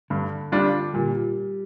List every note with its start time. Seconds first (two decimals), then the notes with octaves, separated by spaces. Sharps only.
0.10 G2 D3
0.52 G3 D4 F4
0.93 A#2 G3